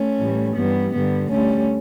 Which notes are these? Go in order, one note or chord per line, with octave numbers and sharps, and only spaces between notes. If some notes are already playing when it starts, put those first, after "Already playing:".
Already playing: A3 C#4
A2 E3 G3
G2 E3 G3 B3
G2 D3 G3 B3
D2 D3 G3 A3 C#4